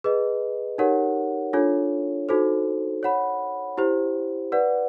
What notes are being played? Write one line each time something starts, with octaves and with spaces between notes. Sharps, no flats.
G#4 B4 D#5
D#4 G4 A#4 C#5 F#5
D4 F4 A4 C#5
D#4 F#4 A4 C5
C#5 F#5 B5
E4 G4 C5
B4 D5 F#5